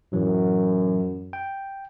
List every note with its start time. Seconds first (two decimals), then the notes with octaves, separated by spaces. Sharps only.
0.13 F#2 A2 E3 F#3
1.33 G5